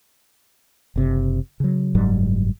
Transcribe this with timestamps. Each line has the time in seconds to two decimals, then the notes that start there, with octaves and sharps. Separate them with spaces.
0.96 F#1 C3
1.60 C#3 F#3
1.95 F#1 G#2 F#3 G3